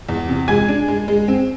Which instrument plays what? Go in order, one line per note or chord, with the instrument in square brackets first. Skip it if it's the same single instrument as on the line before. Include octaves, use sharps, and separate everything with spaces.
[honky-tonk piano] E2
C3
G#3 G#5 G#6
D4
G#3
G#3
C4